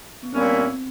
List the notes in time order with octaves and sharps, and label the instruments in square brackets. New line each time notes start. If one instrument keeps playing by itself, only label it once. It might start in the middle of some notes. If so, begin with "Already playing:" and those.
[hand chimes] B3
[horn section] A#2 G3 A#3 C#4 E4 [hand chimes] C4